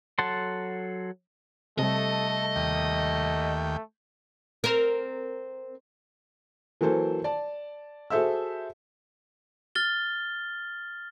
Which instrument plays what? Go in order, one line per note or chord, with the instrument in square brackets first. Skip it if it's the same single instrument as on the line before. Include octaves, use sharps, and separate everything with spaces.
[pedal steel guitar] F#3 A4 F#5 A5 C6
[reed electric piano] C3 G3 [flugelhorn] A3 [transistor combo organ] A4 [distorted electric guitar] D#5
[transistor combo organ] D#2 G5
[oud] C4 A#4
[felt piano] E3 F#3 A#3 A4 C5
D5 A5
F#4 G#4 A4 C5 E5 E6
[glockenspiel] F6 A6 G7